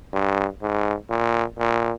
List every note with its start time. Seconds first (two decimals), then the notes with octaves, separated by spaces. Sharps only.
0.13 G2
0.62 G#2
1.10 A#2
1.59 A#2